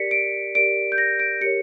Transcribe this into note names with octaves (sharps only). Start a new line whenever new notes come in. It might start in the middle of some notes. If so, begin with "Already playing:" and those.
Already playing: G4 A#4 D5 B6 C#7
D7
G4 A#4 D5 D7
G6
A#6
D7
G4 A#4 C#5 C#7